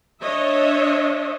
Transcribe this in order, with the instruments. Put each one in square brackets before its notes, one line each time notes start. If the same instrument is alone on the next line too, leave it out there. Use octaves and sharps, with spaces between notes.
[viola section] D4 C#5 D#5 E5